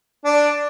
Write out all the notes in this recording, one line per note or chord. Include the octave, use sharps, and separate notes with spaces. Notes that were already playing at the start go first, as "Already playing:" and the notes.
D4